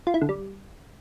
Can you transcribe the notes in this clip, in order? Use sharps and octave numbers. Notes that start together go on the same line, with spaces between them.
F4
E4
D3
G3